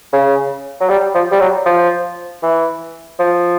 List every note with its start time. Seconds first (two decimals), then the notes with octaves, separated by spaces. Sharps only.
0.12 C#3
0.81 F#3
0.89 G3
1.14 F3
1.31 G3
1.40 F#3
1.65 F3
2.43 E3
3.19 F3